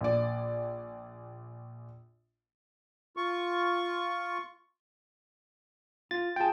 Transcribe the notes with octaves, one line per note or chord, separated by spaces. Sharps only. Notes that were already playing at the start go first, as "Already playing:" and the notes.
A#1 D5
F4 C#6
F4 A6
F4 G#4 G5 A5